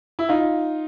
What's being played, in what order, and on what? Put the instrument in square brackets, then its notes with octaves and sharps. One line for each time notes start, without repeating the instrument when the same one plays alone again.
[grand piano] E4
D#4 F4